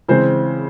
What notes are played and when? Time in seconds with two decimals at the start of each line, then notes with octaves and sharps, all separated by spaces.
0.09 C#3 E3 G#3 C4 C5